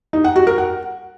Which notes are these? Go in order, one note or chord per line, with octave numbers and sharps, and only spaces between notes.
D#4
F#5
F#4
A#4
F#5